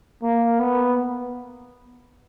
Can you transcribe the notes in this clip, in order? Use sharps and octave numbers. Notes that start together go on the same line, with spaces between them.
A#3
B3